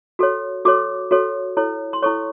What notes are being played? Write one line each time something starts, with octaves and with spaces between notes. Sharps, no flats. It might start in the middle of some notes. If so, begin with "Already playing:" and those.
F#4 A4 C#5
F#4 A4 C#5 D6
F#4 A4 C#5
E4 A4 C#5
C6
E4 A4 C#5 C#6